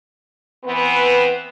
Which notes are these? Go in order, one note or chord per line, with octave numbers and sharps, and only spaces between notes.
E3 B3 C4 B4